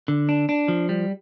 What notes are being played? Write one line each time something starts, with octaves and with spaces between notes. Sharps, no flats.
D3
D4
D4
F3
G3